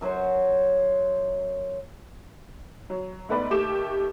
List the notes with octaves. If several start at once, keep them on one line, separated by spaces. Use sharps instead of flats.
F#2 F#3 C5 C#5
F#3
G#2 A3 B3 B4 D5
D#2 A3 G4 D6 E7